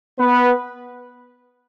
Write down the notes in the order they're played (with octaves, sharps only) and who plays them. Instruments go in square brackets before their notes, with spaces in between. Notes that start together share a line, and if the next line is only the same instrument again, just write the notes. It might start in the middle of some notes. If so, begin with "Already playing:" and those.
[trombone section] B3 B4